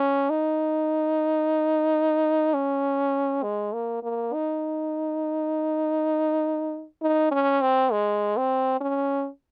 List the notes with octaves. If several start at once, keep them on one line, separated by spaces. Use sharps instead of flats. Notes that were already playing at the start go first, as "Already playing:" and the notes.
Already playing: C#4
D#4
C#4
G#3
A#3
A#3
D#4
D#4
C#4
C4
G#3
C4
C#4